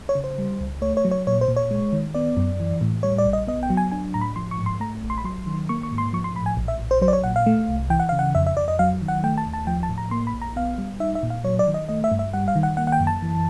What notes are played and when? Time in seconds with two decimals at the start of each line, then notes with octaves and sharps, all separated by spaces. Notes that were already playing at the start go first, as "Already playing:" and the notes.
0.09 C#5
0.15 C#3
0.24 C5
0.38 G3
0.60 C#2
0.82 A3 C#5
0.97 C#5
1.05 F#3
1.11 C#5
1.27 A#2 C#5
1.41 C5
1.48 A#2
1.56 C#5
1.71 G#3
1.93 D#3
2.14 B3 D5
2.37 F#2
2.60 E3
2.81 A2
3.03 G3 C#5
3.18 D5
3.26 A#1
3.33 D#5
3.47 B3 D#5
3.63 G5
3.70 F#3
3.77 G#5
3.92 D4 G#5
4.14 A2 A#5
4.21 B5
4.36 F3 C6
4.51 C#6
4.58 G#2
4.66 C6
4.80 A3 A#5
5.03 A1
5.10 C6
5.18 B5
5.25 F#3 C6
5.47 D#3
5.69 A#3 C#6
5.83 C#6
5.92 G#2
5.98 C6
6.13 F3 C#6
6.24 C6
6.35 A2 B5
6.46 G#5
6.57 A#1
6.68 E5
6.79 A#1
6.91 C5
7.01 F#3 C5
7.08 D5
7.13 C#5
7.24 A#2 F#5
7.36 F5
7.46 A3
7.68 C2
7.90 E3 G5
8.00 F#5
8.09 C#3 F5
8.19 F#5
8.35 F2 E5
8.47 E5
8.57 F2 D5
8.68 D#5
8.79 F#3 F5
9.01 D#3
9.08 F#5
9.24 A3 G5
9.38 A5
9.46 D#2
9.53 A5
9.67 F3 G5
9.83 A5
9.89 A2
9.98 A#5
10.11 A#3 C6
10.27 B5
10.34 A#1
10.42 A#5
10.56 B3 F5
10.78 G3
11.00 D#4 E5
11.15 E5
11.23 A#2
11.30 F5
11.44 F#3 C#5
11.59 D5
11.67 D#3
11.74 D#5
11.89 A3 D#5
12.04 E5
12.12 G2
12.19 E5
12.33 G3 F#5
12.48 F5
12.56 D#3
12.63 F#5
12.77 A#3 F#5
12.87 F#5
12.92 G5
13.00 F#2
13.07 A5
13.22 E3